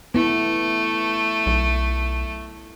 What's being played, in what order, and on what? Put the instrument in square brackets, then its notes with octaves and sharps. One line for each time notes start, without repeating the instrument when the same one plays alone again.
[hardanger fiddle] A3 [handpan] B3 E4
[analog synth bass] B1